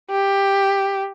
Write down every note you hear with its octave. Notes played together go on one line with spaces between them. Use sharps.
G4